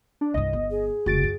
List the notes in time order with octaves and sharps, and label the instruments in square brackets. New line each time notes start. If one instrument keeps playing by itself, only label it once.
[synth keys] D4
[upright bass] C2 G2 [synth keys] D#5
[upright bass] G1
[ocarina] G#4
[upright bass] F1 C#2 [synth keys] F#4 A6 D7
[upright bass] F#2